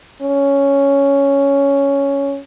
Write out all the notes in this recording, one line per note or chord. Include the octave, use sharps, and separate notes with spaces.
C#4